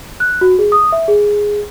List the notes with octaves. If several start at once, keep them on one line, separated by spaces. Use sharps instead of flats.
F#6
F#4
G#4
D#6
E5
G#4